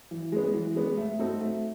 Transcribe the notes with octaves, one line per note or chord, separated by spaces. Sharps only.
E3
G#3 B3
E3
G#3 B3
A3
C4 D#4 F#4 A4
A3